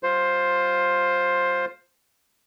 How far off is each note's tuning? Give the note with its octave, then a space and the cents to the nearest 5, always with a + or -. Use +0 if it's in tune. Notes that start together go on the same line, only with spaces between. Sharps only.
G3 +0 F4 +10 C5 +10